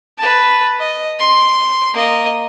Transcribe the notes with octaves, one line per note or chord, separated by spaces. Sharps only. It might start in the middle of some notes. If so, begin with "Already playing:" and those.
B4 A5
D#5
C6
A#3 D#5